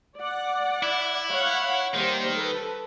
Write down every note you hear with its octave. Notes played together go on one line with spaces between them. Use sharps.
D5 F#5
E4
C#5 F5 F#5
D#3 G3 A#3 C5
A4 B4